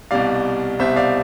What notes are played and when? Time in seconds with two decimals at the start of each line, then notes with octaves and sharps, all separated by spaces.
0.11 C2 B2 G3 D5 F5
0.79 C2 B2 G3 C5 E5
0.96 D5 F5